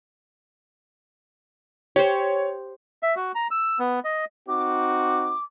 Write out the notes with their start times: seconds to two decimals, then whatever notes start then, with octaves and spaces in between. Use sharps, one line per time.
1.96 G4 C5 C#5
3.03 E5
3.16 F#4
3.35 A#5
3.51 E6
3.79 B3
4.04 D#5
4.48 C4 D#4 F#4 D6